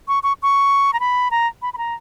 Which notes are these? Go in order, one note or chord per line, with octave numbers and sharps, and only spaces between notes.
C#6
C#6
C#6
A#5
B5
A#5
B5
B5
A#5